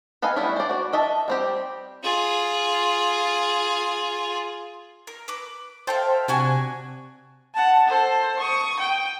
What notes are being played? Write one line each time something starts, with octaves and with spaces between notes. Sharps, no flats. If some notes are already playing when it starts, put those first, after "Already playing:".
A4 B4 D#5 F5 G#5
G3 A3 B3 C#4 E4
C5 D5
F#4 D5
A4 D#5 E5 A5
G3 C4 G4
F4 G#4
A#4
B4 D6
A4 C5 E5 F5 G5
C3 D4 F#4 G#5
F#5 A5
A4 C5
C#6 D#6
G5